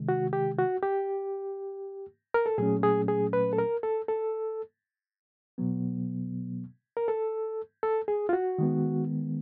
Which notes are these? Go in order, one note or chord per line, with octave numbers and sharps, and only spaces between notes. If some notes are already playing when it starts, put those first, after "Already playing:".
Already playing: C3 D#3 G#3
F#4
G4
F#4
G4
A#4
A4
A#2 F#3 A3 C#4 G#4
G#4
G#4
B4
A4
A#4
A4
A4
B2 F#3 B3
A#4
A4
A4
G#4
F4
F#4
D#3 G#3 B3